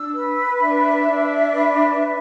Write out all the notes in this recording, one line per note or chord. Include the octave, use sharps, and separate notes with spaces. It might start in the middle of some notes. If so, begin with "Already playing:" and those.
Already playing: D4 E6
B4
D4 E5
D4
B4
B4